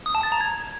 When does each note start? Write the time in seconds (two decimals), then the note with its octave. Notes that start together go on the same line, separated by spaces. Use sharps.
0.06 D#6
0.15 A5
0.23 A6
0.32 A#5
0.41 G#6